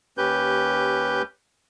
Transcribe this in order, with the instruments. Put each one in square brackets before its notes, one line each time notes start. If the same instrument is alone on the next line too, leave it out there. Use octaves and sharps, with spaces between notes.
[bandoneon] D#2 C#4 G4 B4 G6